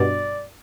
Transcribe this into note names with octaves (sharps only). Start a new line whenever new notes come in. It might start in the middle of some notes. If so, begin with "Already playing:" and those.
Already playing: G2 B2 D5